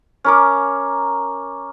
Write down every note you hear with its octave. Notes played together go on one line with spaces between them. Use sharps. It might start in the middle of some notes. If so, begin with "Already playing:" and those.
C#4 A#4 D6